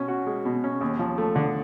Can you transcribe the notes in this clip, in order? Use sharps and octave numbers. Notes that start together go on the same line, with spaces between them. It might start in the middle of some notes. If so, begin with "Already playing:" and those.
Already playing: B2 C#4
F#4
G#3
B2
C#4
D#2
F3
A3
D3